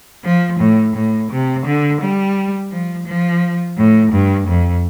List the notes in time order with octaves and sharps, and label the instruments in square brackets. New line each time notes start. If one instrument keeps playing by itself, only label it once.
[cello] F3
A2
A2
C3
D3
G3
F3
F3
A2
G2
F2